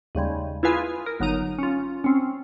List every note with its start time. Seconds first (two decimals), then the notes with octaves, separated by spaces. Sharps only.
0.15 D#2 C#3 G3 G#3
0.63 E4 F4 G#4 B4 F5 G#5
1.06 A#4
1.20 G1 F#3 D#4 A#5 D#7
1.59 C#4 F4
2.04 C4 C#4